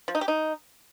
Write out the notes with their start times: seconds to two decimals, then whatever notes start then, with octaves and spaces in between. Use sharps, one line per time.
0.08 F3
0.15 D#4
0.21 G4
0.28 D#4